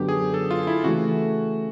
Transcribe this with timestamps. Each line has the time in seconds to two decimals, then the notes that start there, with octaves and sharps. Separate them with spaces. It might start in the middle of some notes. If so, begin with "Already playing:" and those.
Already playing: F#2 D3 F#3 B3 G4
0.09 G#4
0.34 A4
0.51 F4
0.67 E4
0.84 C#3 E3 A3 F#4